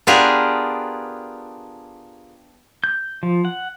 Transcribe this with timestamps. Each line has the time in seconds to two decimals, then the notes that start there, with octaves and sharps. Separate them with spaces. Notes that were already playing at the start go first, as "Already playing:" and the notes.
0.07 B3 D4 F4 G4 G#4 A#4
2.84 G6
3.23 F3
3.45 F#5